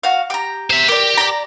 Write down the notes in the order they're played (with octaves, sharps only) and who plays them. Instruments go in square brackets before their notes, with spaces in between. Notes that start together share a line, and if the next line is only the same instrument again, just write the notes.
[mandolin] F#4 F5
G4 A#5
[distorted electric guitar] C5 E5
[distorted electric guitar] G4 [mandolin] A#4 D5
[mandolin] D5 A#5